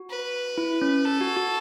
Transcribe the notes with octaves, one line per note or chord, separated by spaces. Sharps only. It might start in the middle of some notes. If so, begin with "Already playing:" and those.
Already playing: F#4
B4
E4
C#4
A4
F#4
F#4